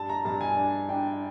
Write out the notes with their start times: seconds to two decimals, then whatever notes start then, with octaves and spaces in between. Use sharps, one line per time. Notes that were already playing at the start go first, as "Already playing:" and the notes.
Already playing: G2 A5
0.09 A#5
0.25 G2 A5
0.41 G#5
0.57 D4
0.89 D4 G5